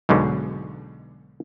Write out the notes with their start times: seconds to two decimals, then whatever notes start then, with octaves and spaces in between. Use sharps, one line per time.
0.09 B1 G#2 B2 D3